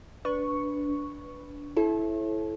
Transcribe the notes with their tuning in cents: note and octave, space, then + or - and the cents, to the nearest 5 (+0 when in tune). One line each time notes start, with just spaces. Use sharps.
D4 -15 B4 +0 C#6 +0
E4 +0 A4 -30 C#5 -45